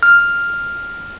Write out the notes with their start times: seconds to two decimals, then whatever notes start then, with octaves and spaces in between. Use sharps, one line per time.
0.03 F6